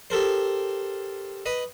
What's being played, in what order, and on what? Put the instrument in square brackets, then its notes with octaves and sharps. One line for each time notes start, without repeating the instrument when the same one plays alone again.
[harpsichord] G4 A4 A#4 C5
B4 D#5